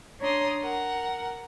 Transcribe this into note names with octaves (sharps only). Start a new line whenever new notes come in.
D4 C#5 A#5 C6 D#6
A#4 F#5